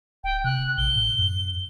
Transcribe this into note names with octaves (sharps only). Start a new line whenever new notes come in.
D1 G5
C3 F#6
A1 G7
A2
F#2